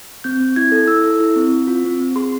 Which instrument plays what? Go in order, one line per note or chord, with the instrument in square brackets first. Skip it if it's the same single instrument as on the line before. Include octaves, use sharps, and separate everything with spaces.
[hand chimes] C4 G6
C4
E4 G#6
A4
E4 E6
A4
E4
C4
C4
F4
C4
C4
G#4 C6